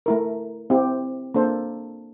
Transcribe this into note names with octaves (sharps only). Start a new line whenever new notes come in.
A3 E4 A#4
C4 E4 G4
A#3 D4 A4 C5